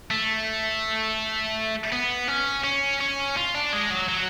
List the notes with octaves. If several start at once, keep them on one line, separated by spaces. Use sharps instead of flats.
A3
B3
C#4
C#4
C#4
F4
D4
G#3
F#3
F#3